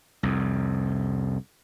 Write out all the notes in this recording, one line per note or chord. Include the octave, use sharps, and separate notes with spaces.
C2 F2